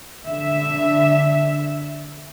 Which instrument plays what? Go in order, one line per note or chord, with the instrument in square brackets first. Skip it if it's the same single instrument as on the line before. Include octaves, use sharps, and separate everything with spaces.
[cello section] D3 E5